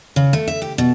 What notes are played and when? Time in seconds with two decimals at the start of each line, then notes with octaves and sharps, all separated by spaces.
0.16 C#3
0.33 A3
0.48 E5
0.62 G4
0.78 B2